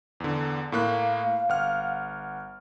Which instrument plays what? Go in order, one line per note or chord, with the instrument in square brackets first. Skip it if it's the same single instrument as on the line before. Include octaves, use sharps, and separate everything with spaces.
[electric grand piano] E2 D3
[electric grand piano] A2 A#3 F#6 [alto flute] F5
[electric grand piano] G1 F#5 F6